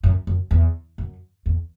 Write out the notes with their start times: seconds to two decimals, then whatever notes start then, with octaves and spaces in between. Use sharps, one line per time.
0.03 F#2
0.27 F#2
0.51 E2
0.98 F#2
1.46 E2